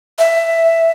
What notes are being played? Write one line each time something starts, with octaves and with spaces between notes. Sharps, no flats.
E5